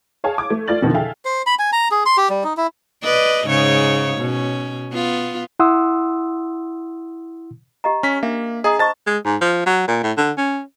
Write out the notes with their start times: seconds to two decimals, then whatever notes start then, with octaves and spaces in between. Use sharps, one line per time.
0.24 G#4 C#5 F5 G#5 A5
0.38 D6 G#6
0.50 A3
0.68 A3 F4 D5 A6 F#7
0.81 C2 F2 B2 D3 D#3 F3
0.94 G#4 A4 E5 F5 G5 G#5
1.25 C5
1.47 B5
1.59 G#5
1.73 A#5
1.91 G#4
2.06 C6
2.17 G4
2.30 G3
2.44 D#4
2.57 E4
3.03 B4 D5 D#5
3.46 G#2 C#3 C#5
4.18 B2 C#4
4.92 B3 F4
5.59 E4 F#5 C6 D#6 E6
7.84 G4 D#5 A#5
8.03 C#4 B6
8.23 A#3 D4 E5
8.64 G#4 D#5 A#5 D#6
8.79 C5 D#5 A5 C#6 A6
9.07 G#3
9.25 G#2
9.41 F3
9.66 F#3
9.88 A#2
10.03 A2
10.18 D3
10.37 C#4